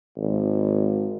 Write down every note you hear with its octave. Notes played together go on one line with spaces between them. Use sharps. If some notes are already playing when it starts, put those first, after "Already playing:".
G#1